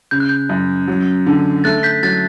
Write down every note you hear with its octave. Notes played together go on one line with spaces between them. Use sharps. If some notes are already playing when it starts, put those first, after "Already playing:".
C#3 G6
F#6
G6
F#2
F#3
D3
A3 F#6 A6
G6 B6
F#3 F#6 A6